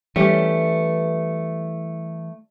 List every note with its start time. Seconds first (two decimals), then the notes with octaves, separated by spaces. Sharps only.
0.16 E3 G3 A3 C#4 G4